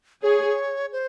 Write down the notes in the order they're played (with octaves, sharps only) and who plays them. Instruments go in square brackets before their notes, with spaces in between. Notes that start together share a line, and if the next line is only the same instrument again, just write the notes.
[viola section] G#4 [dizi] C#5
[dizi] C5